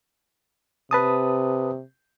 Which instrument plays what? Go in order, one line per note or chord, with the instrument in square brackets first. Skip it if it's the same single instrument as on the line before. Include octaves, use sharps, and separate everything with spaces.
[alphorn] C3 [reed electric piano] B4 A5 D#6